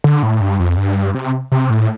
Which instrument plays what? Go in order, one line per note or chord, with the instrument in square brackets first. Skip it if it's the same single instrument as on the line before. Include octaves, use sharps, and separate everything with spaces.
[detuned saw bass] D3
A2
G2
F2
G2
C3
C3
A2